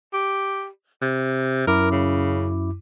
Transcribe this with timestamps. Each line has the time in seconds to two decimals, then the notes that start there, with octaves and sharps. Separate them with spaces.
0.13 G4
1.01 C3
1.67 F#2 E4 A#4 D6
1.91 C#3